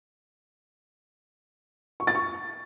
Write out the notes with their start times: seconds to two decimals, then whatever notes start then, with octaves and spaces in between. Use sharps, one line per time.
2.00 C#6
2.07 A6
2.15 C#6